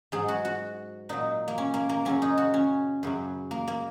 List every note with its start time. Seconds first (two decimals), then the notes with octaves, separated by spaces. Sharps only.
0.12 G#2 F#3 G#4
0.28 F#4
0.45 F#4
1.09 A#2 F#3 D#4
1.48 A#3
1.58 C#4
1.74 A#3
1.89 A#3
2.05 F#2 C#3 F#3 C#4
2.22 D#4
2.38 F#4
2.54 C#4
3.03 F#2 C#3 F#3
3.51 A#3
3.67 A#3